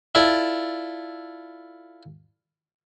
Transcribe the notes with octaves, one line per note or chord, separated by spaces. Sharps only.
E4 F4 A4 D5